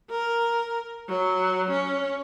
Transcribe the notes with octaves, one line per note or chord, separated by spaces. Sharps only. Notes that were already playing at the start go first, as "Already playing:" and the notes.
A#4
F#3
C#4